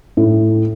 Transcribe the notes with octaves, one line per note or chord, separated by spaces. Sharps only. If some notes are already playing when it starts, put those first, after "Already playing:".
A2